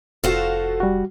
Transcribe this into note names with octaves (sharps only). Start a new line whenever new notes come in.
F1 F4 F#4 A4 C5 F5
G3 F#4